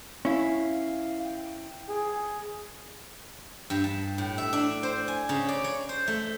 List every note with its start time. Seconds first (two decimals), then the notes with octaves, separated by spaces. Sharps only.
0.25 C#4 E4 F5
1.25 G5
1.89 G#4
3.70 G2
3.84 A5
4.18 A2
4.38 E5
4.53 D4
4.83 C5
5.08 G#5
5.29 C#3
5.49 D5
5.64 C#5
5.89 C5
6.08 A3